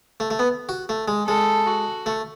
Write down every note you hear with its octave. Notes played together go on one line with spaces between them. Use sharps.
A3
A3
B3
F#4
A3
G#3
G#3 A4
F#4
A3